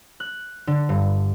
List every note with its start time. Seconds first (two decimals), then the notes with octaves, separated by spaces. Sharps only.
0.20 F#6
0.67 D3
0.89 G2